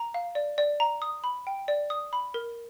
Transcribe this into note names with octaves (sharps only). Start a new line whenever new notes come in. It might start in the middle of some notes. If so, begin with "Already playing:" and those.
Already playing: A#5
F5
D5
D5
A#5
D#6
B5
G5
D5
D#6
B5
A#4